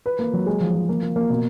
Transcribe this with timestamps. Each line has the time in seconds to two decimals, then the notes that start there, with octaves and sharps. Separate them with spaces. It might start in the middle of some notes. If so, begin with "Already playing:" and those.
0.06 B4
0.19 A#3
0.33 F#3
0.46 G#3
0.60 F3
0.75 F3
0.89 A#3
1.03 A#3
1.16 A#3
1.30 B2